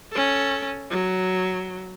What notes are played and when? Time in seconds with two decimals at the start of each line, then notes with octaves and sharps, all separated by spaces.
0.11 C#4 A4
0.91 F#3